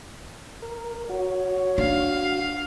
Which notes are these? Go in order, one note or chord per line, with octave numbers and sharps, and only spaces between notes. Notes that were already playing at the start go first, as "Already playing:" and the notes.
A#4
F#4 C#5
D4 F5